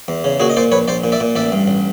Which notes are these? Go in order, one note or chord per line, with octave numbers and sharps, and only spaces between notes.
E2
C#3
A#2 F#4 G#4
D#5
A#2 C5 D5
A#1 B4 C#5
A#1 C5 D5
A#2
D5 E5
A#2
A1 D5 E5
G2
A1